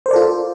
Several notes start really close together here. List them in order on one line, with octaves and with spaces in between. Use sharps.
C5 A#4 D5 A4 F4